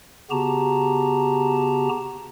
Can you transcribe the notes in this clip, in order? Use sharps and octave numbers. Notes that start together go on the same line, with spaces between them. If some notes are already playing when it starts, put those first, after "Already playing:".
C#3 B3 F#4 G4 A5 A#5